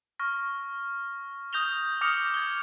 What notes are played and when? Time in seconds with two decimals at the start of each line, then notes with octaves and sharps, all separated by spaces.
0.19 C#6 F6 A#6
1.53 D#6 G6 A#6 F7 G7
2.01 D6 D#6 F6 A#6 C#7 F7
2.34 G#6 G7